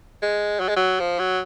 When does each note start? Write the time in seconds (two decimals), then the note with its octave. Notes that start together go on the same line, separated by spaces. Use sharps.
0.22 G#3
0.60 F#3
0.69 G#3
0.76 F#3
1.00 F3
1.19 F#3